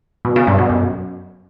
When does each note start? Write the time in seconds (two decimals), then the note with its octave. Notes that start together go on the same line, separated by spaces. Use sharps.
0.25 B2
0.36 C#3
0.47 G2
0.58 B2
0.70 F#2